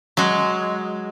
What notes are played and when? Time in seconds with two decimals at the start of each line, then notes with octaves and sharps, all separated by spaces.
0.17 F#3 G#3